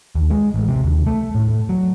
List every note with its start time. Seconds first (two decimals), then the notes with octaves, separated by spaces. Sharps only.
0.15 D#2
0.30 G#3
0.54 A1
0.69 C3
0.84 D#2
1.07 A3
1.35 A2
1.69 F#3